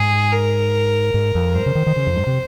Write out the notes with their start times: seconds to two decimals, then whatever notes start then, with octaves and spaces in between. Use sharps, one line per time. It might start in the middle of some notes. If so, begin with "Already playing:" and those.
Already playing: G#2 G#4
0.32 A#4
1.14 G#2
1.35 F2
1.55 G2 C5
1.66 C#3
1.75 D#3
1.87 D#3
1.96 C#3
2.07 F2
2.16 G2
2.27 C3